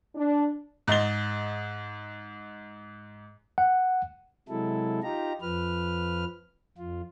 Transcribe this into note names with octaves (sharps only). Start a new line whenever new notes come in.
D4
G#2 D#5 A6 G7
F#5
C3 F#3 G#3 E4 A4
D#4 F4 G4 A#5
F2 F3 B4 F6
F2 F4